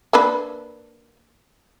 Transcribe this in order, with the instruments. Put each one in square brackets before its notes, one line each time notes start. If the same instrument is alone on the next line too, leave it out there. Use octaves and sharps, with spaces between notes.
[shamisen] A#3 D4 B4